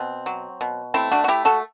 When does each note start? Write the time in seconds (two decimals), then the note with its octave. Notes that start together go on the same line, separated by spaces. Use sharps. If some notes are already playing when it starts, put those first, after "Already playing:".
Already playing: B2 C4
0.26 F#3
0.61 B2
0.94 A3 C4 E4
1.12 D4 F#4
1.24 F#4
1.28 A3 E4 G4
1.45 F#4 A4